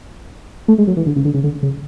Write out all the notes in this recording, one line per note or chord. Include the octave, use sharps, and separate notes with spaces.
A3
G#3
F#3
E3
D3
C#3
D3
C#3
D3
C#3